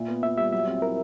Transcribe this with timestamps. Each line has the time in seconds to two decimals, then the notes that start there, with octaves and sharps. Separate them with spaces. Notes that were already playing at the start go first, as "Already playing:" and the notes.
Already playing: A#2 E5
0.08 B3
0.23 A#2 E5
0.37 G3 E5
0.52 F#3 E5
0.67 C4
0.82 E4 A#4